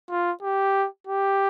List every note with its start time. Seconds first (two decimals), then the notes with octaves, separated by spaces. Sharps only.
0.10 F4
0.42 G4
1.07 G4